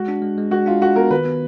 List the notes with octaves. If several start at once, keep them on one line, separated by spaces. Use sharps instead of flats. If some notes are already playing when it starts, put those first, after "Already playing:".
Already playing: G#3 F#4
D4
G#3
G#3
G#3 F#4
D4 F4
D4 F#4
B3 A#4
D#3 B4
B3